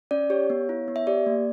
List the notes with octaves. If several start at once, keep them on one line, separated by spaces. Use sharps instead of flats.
C#4 D5
G4 C#5
B3
E4
B3
E5
G4 D5
A#3